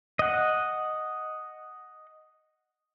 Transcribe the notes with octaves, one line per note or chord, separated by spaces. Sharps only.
D#5 F#5